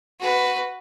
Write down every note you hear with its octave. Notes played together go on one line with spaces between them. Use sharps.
F#4 B4